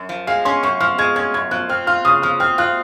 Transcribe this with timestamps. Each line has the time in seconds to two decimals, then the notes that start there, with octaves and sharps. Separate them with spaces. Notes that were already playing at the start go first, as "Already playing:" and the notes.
Already playing: F#2
0.09 F3
0.27 G#3 F5
0.45 C#4 C6
0.63 F#2 C#6
0.80 F3 F6
0.98 G#3 G#6
1.16 C#4 G#6
1.34 F#2 G#6
1.51 F3 F#6
1.69 C4 F6
1.87 F4 F6
2.05 C#3 D#6
2.22 F3 F6
2.40 C4 F6
2.58 F4 F#6